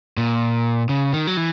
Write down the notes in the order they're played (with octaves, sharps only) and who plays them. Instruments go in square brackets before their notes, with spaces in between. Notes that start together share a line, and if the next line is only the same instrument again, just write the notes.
[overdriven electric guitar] A#2
C#3
D#3
F#3
E3